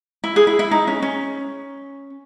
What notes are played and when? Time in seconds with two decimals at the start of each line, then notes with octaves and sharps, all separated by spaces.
0.24 E4
0.36 G#4
0.47 E4
0.59 E4
0.71 D#4
0.87 C#4
1.02 C#4